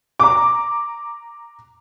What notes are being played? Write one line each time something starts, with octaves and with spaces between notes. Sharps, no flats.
A#5 D6